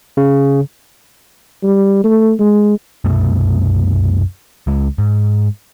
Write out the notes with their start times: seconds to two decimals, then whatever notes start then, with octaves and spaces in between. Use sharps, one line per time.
0.17 C#3
1.64 G3
2.04 A3
2.40 G#3
3.04 C2 F#2 B2 A3
4.67 C#2 G#3
4.98 G#2